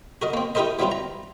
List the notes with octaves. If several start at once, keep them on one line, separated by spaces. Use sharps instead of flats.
F#4 A#4 D#5
A#3 C4
D#4 E4 G4 A#4 C5 D#5
E3 F#3 G3 C4 E4 F4
A#5